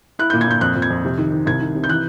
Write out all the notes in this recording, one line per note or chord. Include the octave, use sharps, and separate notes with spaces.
E4 F#6
A#2 G6
G#6
A#2 G6
F2 F#6
F2
G#6
F2
C3
D#3
D#3
C2 G#6
D#3
C3
G6
E3 F#6